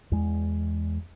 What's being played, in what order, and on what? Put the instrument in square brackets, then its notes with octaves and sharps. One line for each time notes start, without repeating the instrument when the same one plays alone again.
[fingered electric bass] E2 G#3